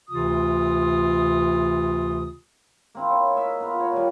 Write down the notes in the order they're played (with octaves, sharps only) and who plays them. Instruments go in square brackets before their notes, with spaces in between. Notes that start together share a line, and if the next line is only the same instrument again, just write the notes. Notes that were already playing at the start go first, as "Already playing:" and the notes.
[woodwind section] D2 C3 E3 F4 D#6
[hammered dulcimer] A#3 C4 E4
C#5
A#4 D#5 E5
B3 F4 A#4
C#5 A#5
A#2 G3